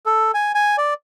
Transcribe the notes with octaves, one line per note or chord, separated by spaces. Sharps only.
A4
G#5
G#5
D5